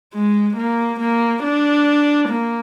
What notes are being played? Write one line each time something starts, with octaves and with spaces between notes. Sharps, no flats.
G#3
A#3
A#3
D4
A#3